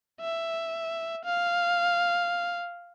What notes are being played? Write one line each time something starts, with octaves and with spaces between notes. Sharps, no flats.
E5
F5